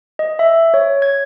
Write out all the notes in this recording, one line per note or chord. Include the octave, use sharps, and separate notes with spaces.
D#5
E5
C#5
G#6